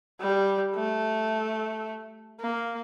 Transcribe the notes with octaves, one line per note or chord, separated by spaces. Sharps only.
G3
A3
A#3